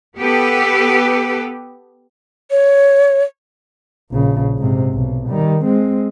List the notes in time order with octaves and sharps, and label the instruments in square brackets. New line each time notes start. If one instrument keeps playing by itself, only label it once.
[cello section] B3 G4 A4 B4
[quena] C#5
[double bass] A#1 C#3
G#2 C3
B1
D#3 G3
G#3 C4